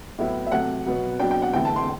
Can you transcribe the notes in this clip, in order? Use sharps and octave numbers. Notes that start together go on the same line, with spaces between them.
A2 F#3 B3 E4
E5
C3 F#3 A3 F#5
B2 F#3 B3
B2 F#3 B3 D4 G5
G5
F#5
E2 D3 A3 C4 E4 G5
A5
C6